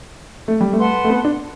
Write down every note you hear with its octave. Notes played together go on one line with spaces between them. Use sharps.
A3
G3
A3
B4 F#5 A5 C6
A3
B3
D4